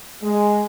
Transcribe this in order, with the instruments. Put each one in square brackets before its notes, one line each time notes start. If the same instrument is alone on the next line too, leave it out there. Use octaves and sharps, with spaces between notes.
[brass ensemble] G#3